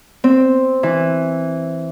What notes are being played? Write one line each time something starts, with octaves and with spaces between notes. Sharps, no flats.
C4
E3